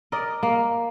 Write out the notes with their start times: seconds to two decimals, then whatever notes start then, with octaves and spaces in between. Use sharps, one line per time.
0.12 A#4 D5 D#5
0.43 A#3